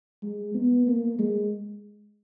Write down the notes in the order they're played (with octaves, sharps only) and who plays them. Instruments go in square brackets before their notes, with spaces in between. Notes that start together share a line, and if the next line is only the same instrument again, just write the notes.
[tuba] G#3
B3
A#3
G#3